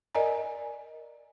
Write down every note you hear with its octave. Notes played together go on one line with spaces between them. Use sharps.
A#4 D5 D#5 G#5 A#5